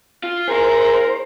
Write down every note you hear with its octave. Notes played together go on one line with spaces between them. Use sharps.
F4
E4 G#4 A#4 C5